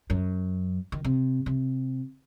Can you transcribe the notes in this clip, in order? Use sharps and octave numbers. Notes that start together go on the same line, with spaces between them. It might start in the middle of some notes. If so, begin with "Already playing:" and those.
F#2
D#3
C3
C3